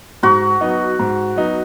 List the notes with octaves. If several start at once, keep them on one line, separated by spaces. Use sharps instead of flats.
G#2 F#4
F#3 B3 D#4
G#2
F#3 B3 D#4